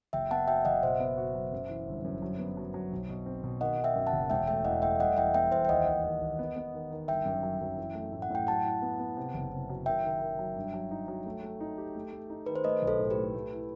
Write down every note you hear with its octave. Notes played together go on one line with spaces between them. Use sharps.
F#1 E5 G5
B3 F#5 A5
F#3 E5 G5
F#1 D#5 F#5
B2 C5 E5
B3
F#4
F#3
F#2
E3
G1
F#2
F#3
B3
F#3
F#3
B1
B2
C4
B2
D#3 D#5 F#5
D#3
E5 G5
F#2
F#5 A5
F#1
E1 E5 G5
A3 E5 G5
E2 D#5 F#5
A3 E5 G5
G3 D#5 F#5
E2 E5 G5
B3 E5 G5
E2 C5 E5
G5
D#2 D#5 F#5
D#2
D#2
D#2
B3
B3
D#3
D#3
G1 E5 G5
F#2
F#3
F#2
E3
A3
A2
F#5
A2 G5
F#3 F#5 A5
E4
B3
B3
C3
F#1
C3
F#3
D#3 E5 G5
D#3
D#3
F#3
G2
F#3
D#4
F#3
A3
A3
D#4
G4
A3
A3
D#4
D#3 B4
C5
A3 B4 D#5
B1
A4 C5
A2
G4 B4
A3
A3
E4